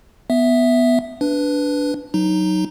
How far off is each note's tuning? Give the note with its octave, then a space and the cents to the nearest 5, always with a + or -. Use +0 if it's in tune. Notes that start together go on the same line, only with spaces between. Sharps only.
B3 +0 E5 +0
D4 -10 B4 +5
F#3 +0 D#4 +0